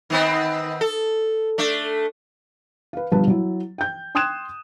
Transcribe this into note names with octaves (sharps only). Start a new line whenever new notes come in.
D#3 B3 C4
A4
A3 D4
B4 F5
G1 G2 F3 B4 F5 A5
F#3 E4
G5 G6
G5 C6 D#6 F#6 G#6 E7